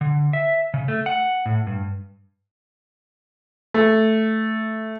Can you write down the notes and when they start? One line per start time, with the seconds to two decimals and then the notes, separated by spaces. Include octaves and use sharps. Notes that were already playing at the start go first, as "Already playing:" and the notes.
0.01 D3
0.33 E5
0.74 C#3
0.88 A3
1.06 F#5
1.46 A2
1.67 G2
3.74 A3